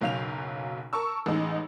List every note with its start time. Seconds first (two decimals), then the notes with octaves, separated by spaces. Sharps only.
0.01 F#1 B1 F#3 F5 G6 F7
0.93 A#4 A5 C#6 E6
1.26 A1 G#3 D#4